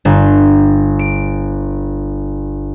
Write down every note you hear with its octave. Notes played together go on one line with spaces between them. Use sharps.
G1
D7